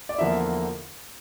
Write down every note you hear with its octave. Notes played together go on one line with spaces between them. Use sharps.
D5
E2 D3 F3 A#3 E4 E5